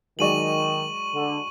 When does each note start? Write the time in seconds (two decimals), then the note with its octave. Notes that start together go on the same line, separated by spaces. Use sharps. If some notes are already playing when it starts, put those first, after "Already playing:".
0.19 D#3 F#3 G#3 D5 C#6 D#7 F#7
1.14 D3